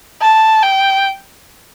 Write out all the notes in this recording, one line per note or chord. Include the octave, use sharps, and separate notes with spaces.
A5
G5